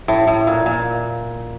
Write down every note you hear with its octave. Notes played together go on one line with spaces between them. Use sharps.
A2
A2
A#2
A#2